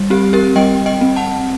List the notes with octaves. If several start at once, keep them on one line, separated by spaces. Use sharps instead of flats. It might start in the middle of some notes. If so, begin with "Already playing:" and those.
Already playing: G3
C4 G4
G4 A#4
G3 D#5 G5
D#5 G5
C4
F#5 A5